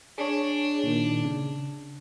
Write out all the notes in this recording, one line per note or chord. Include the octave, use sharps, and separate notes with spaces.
D4 G#4 C#5
A#2 D#3
C#3